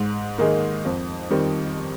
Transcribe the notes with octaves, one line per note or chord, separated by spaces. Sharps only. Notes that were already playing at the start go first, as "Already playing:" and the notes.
Already playing: G#2
D#3 A#3 D#4 G#4
F2
D#3 G3 C4